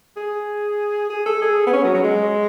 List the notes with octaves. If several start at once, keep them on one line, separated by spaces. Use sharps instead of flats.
G#4
G#4
A4
G#4
B3
C#4
F#3
F#3
G#3